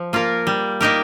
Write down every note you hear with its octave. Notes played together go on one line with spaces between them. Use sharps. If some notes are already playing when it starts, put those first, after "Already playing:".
Already playing: F3
A#3 F4 A#4
G3
A#3 D#4 G4 A#4